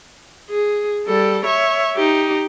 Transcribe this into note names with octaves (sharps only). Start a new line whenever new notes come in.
G#4
G3 A4
C#5 E5
D#4 G4